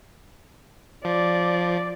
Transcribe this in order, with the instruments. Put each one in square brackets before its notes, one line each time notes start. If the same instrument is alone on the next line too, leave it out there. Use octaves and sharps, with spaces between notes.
[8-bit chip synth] F3 [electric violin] D5